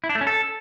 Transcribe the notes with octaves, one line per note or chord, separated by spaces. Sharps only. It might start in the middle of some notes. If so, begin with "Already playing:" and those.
E4
D4
A3
C#4
A4